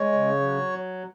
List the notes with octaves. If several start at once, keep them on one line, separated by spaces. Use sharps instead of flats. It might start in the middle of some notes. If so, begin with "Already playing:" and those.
Already playing: G#3 C#5
C#3
F#3